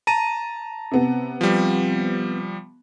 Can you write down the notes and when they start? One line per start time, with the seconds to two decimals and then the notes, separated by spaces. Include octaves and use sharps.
0.07 A5 A#5 D#7
0.91 C3 B3
1.41 F3 G3